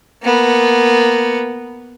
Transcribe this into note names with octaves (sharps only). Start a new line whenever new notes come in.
A#3 B3